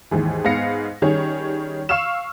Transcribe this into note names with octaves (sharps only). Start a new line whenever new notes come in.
D#2 G#2 E3
G#2 B3 F5 A#6 C#7
D#3 G3 C#4 G#4 C#5
F5 C#6 E6 F6 E7